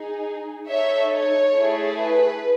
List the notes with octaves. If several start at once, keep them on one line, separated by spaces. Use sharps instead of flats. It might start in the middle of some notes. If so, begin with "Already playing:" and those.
Already playing: D#4 G#4
D#4 A4 C#5 E5
C#5
A3 E4 G#4
B4